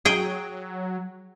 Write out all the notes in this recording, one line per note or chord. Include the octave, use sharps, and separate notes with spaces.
F#3 G#4 G5